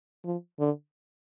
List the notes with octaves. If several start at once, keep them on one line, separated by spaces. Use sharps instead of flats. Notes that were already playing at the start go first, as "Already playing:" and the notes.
F3
D3